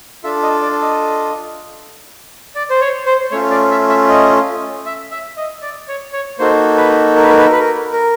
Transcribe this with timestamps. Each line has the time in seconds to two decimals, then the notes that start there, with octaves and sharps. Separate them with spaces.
0.24 D4 F4 A4 E5
0.43 D#5
0.62 D5
0.82 D#5
2.55 D5
2.70 C5
2.81 C#5
3.06 C5
3.31 A3 C#4 F4 C#5
3.50 D5
3.71 E5
3.89 E5
4.09 D#5
4.86 E5
5.11 E5
5.37 D#5
5.62 D5
5.88 C#5
6.13 C#5
6.39 A#3 D#4 F#4 A4 C5
6.77 B4
7.16 A#4
7.23 B4
7.30 A#4
7.38 B4
7.45 A#4
7.52 B4
7.60 A#4
7.92 A#4